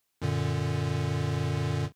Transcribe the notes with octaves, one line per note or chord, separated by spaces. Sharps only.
F#2 A#2 D3